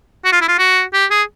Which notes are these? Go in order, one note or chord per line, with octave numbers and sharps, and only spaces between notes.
F#4
F4
E4
F4
F#4
G4
G#4